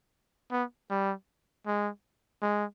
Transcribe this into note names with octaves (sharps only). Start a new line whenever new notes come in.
B3
G3
G#3
G#3